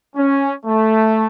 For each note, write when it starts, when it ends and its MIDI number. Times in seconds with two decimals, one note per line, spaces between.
0.16 0.53 61
0.66 1.26 57